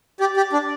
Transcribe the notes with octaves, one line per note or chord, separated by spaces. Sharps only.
G4 D5
G4
D4